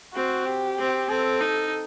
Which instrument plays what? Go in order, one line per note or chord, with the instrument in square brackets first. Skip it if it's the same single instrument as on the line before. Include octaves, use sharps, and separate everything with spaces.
[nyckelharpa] C4 [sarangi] F#4
[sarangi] G4
[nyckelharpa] C4
[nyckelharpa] C4 [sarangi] A4
[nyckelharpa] D#4